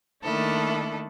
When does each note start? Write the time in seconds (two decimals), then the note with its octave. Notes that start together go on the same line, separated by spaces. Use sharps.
0.23 D#3 A3 A#3 D4 E4 A4